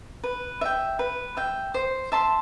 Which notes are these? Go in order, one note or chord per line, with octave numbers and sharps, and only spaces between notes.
B4
E5 G5
B4
E5 G5
C5
E5 A5 C6